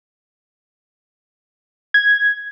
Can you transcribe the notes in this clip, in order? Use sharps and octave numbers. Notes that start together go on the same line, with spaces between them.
G#6